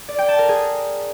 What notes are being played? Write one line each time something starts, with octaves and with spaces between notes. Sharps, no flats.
D5
G5
A5
A#4
G#4